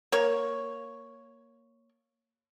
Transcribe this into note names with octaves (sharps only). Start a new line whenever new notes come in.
A#3 C#5